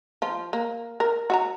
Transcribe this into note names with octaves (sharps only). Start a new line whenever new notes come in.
F3 F4
A#3
A#4
F#4 E5 A#5